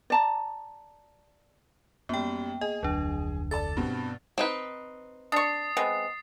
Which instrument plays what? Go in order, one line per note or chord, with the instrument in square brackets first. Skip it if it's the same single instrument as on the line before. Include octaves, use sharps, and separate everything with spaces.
[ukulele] D5 A5 A#5
[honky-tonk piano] F#2 G3 [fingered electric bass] A#3 [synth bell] B3 G5
[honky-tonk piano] G#4 [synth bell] D#5
[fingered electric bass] F1 D2 [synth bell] F#3 D4
[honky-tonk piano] A4 D5 A5 [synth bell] A6
[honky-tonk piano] G2 B2 C4
[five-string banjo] C4 D#4 B4
[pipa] D4 C#6 [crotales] D#6 A6 C7
[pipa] G#3 B3 C4